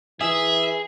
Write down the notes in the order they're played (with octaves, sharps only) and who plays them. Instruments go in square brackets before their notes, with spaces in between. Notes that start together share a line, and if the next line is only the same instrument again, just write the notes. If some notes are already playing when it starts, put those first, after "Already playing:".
[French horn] E3 [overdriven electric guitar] G#4 [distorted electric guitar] E5